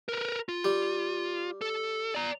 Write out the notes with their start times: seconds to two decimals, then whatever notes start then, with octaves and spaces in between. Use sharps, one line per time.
0.09 A#4 B4
0.49 F4
0.65 G3
1.61 A4
2.15 D5 A#5